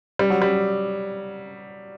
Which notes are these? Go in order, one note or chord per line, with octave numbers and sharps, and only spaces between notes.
G3
F#3
G3